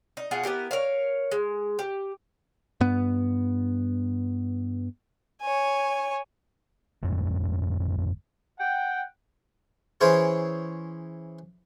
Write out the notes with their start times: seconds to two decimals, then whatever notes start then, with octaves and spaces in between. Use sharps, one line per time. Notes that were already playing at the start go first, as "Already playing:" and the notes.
0.17 D#4
0.31 B2 F4 G#4 F#5
0.43 B3 E4 G4 A#4
0.71 A#4 C#5 F5
1.32 G#3
1.79 G4
2.81 G2 B3
5.42 C#5 G#5
7.03 G1 F2 A2 G#3
8.60 F#5 G5
10.01 E3 C#4 E4 G#4 C5 C#5